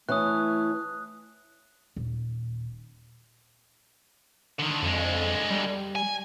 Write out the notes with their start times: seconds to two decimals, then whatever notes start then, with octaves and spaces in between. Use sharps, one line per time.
0.09 E3 A3 C#4 D#6 F#6
1.96 D#1
4.59 D3 D#3
4.83 F2 D3 G#3
5.50 G3
5.96 G#5